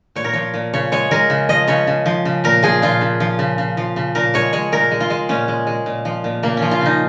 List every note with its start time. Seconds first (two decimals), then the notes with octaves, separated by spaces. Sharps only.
0.16 A#2 C#5
0.24 A#4
0.33 F3 C#5
0.54 A#2
0.73 C#3 C#5
0.92 G#3 C#5
1.11 G#3 A#4
1.30 C#3
1.49 F3 D#5
1.68 C#3 C#5
1.87 C#3
2.06 F3
2.25 C#3
2.44 A#2 A#4
2.63 F3 G#4
2.82 A#2 F4
3.01 C#3
3.20 F3
3.39 C#3
3.58 C#3
3.77 F3
3.96 C#3
4.15 A#2 A#4
4.34 G#3 C#5
4.53 G#3 C#5
4.72 A#2 A#4
4.91 G#3
5.00 F4
5.10 G#3
5.29 A#2 C#4
5.48 G#3
5.67 G#3
5.86 A#2
6.05 F3
6.24 A#2
6.43 C#3 A#3
6.57 C#4
6.62 F3
6.71 F4
6.81 C#3 D#4